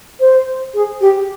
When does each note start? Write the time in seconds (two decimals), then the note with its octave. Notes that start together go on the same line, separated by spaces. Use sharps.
0.20 C5
0.74 G#4
1.01 G4